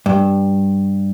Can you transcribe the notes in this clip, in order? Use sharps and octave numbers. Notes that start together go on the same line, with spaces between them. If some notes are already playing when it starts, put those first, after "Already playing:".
G2